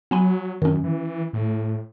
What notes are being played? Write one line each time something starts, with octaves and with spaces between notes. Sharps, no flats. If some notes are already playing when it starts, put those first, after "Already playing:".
F#3 B3 G#5 B5
F#2 D#3 C#4
E3
A2